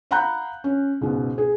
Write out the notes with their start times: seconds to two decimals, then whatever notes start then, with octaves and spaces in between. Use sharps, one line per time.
0.11 F5 F#5 A#5 B5 F#6 G6
0.64 C#4
1.01 C#2 G#2 B2
1.38 G#4